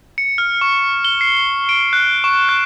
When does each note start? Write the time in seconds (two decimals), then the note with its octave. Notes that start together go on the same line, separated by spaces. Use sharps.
0.18 C#7
0.38 F6
0.61 C#6
1.05 G7
1.21 C7
1.69 D7
1.93 F#6
2.24 C#6
2.49 F#6